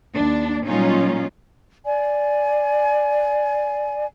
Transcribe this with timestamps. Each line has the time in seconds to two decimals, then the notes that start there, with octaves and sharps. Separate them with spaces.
0.15 D#2 D4
0.66 A#2 F#3 G3 C#4 D#4 F4
1.84 D5 G#5